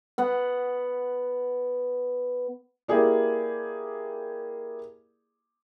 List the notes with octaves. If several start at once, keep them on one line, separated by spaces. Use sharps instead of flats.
B3 F#5
A#3 E4 G4 G#4 D5